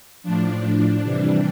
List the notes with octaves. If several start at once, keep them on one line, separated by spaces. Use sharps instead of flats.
A2 F3 D4
C3 E3 G3